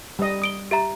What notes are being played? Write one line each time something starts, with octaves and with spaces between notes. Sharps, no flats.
G3 D#5
D#6 D7 G7
G4 E5 A#5